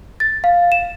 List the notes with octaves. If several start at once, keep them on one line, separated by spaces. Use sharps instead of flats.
A6
F5
E7